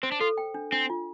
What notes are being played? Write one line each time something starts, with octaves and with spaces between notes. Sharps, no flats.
C4 C5
D4
F4 A4
G5
D4
C4 D4
F4